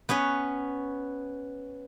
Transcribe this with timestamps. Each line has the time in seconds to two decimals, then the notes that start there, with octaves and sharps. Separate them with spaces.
0.09 B3 C#4 B4 C#5